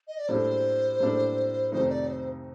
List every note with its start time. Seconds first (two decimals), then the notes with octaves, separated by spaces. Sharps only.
0.08 D#5
0.18 D5
0.28 A2 G3 A#3 D4 A4 C5
1.00 A2 G3 A#3 D4 A4
1.72 F2 C3 D#3 A3 D#4 C5
1.89 D5
2.07 C5